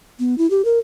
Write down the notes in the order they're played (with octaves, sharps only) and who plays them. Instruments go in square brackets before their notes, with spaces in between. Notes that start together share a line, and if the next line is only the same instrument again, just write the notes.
[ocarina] B3
E4
G4
A#4